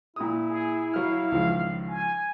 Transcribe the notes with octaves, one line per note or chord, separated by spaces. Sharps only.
A#2 E4 D#6
G#4
F#3 F5 F6
C#2 D#3 F3
G#5